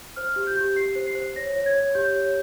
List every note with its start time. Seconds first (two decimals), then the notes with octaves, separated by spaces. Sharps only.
0.16 C5 F6
0.36 G4
0.47 G6
0.57 G4
0.76 G4 C7
0.96 C5
1.06 C7
1.15 C5
1.36 C#5 A#6
1.56 C#5
1.66 G#6
1.75 C#5
1.95 G4 G6
2.16 C#5